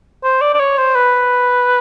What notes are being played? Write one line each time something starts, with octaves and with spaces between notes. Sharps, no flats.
C5
D5
D5
C#5
C5
B4